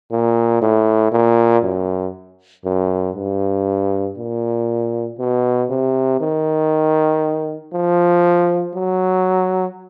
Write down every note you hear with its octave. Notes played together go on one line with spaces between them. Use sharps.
A#2
A2
A#2
F#2
F#2
G2
A#2
B2
C3
D#3
F3
F#3